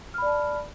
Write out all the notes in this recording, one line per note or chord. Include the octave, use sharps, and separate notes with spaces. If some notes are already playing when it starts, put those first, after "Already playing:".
D5 A5 B5 F6